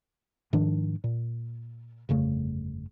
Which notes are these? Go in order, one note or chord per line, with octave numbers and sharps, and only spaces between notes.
G#2 D#3 F3 D4
A#2
G1 F2 C#3 A3